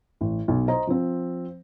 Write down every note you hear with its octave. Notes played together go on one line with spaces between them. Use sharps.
A1
B1
C5 D#5 A#5
F3 C4